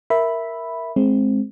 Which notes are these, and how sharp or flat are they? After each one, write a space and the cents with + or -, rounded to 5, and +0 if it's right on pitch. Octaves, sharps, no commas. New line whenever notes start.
A#4 +0 E5 +0 B5 +0
G#3 +20 C4 +10